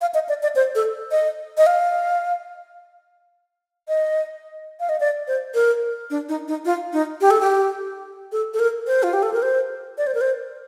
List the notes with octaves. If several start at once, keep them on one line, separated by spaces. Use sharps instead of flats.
F5
D#5
D5
D5
C5
A4
D#5
D#5
F5
D#5
F5
D#5
D5
C5
A#4
D4
D#4
D#4
F4
D#4
G4
A4
G4
A4
A4
A#4
C5
F4
G4
A4
A#4
C5
D5
C5
A#4
C5